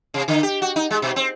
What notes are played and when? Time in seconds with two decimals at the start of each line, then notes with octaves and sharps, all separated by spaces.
0.14 C3
0.28 D3
0.43 G4
0.62 F#4
0.76 D#4
0.91 G#3
1.02 B2
1.16 C4